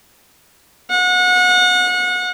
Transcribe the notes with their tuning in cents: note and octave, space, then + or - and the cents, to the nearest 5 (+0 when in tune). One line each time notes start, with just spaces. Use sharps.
F#5 -30